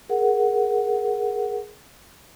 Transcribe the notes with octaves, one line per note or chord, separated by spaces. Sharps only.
G#4 A#4 F#5